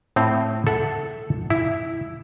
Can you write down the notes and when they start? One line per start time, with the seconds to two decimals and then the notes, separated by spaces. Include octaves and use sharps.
0.16 A2 C4
0.67 A4 E5 F#5
1.50 E4